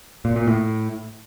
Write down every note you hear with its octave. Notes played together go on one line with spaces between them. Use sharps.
A#2
A#2
A2